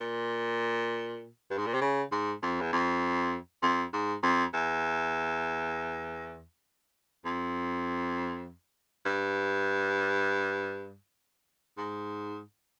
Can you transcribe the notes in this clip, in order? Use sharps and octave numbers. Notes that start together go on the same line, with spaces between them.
A#2
G2
G#2
A#2
C3
C#3
G#2
F2
E2
F2
F2
G#2
F2
E2
F2
G2
G#2